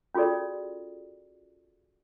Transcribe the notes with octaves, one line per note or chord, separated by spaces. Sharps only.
C#4 F4 F#4 G#4 A4 D5